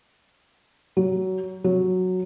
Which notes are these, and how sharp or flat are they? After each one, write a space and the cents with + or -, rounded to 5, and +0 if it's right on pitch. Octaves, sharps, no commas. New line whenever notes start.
F#3 +20
F#3 -5